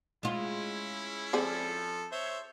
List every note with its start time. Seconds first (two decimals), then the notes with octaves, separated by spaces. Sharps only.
0.23 G#3 C#4 E4 F4
1.33 F3 C4 G#4 A4 D5
2.12 C5 C#5 E5